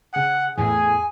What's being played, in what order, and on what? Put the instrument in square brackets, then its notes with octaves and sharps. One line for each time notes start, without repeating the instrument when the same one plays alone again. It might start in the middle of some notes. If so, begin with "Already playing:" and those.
[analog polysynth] C#3 G#4 [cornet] F#5
[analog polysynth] E2 A2 E3 [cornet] G#4 [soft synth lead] G#5